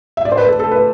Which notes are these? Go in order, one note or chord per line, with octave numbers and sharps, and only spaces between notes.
E5
D5
C5
B4
A4
A4
B4